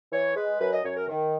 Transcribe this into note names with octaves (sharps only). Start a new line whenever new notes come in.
E3 C#5
G#3 B4
F#2 B4
D#5
F#2 C#5
A#4
D#3